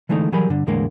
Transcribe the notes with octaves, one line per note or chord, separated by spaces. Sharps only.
D3 E3 G#3 A3 C#4 D#4
E3 F#3 G3 G#4 A#4 B5
G2 D3
E2 A2 D3 G#3 A#3